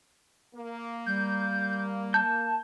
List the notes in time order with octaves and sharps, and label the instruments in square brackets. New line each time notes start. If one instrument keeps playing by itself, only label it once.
[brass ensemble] A#3
[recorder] G3 [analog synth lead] G6
[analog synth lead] A5 [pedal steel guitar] G6